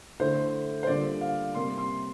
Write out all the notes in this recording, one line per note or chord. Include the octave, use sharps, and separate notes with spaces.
D3 A3 E4 C5
C5
D3 G3 A#3 D4 F4 D5
F5
C3 G3 A#3 C6
C6